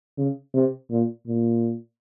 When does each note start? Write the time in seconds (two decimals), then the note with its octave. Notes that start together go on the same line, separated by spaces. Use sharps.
0.17 C#3
0.54 C3
0.91 A#2
1.27 A#2